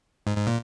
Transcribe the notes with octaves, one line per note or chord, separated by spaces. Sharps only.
G#2
G#2
A#2